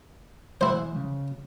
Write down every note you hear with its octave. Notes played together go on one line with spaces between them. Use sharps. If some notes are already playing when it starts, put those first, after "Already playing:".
E2 E3 G#3 E4 C5
C#3